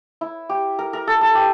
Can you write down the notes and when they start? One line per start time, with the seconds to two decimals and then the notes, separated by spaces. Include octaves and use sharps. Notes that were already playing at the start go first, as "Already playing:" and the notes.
0.21 E4
0.49 G4
0.79 A#4
0.93 A#4
1.07 A4
1.21 A4
1.35 G4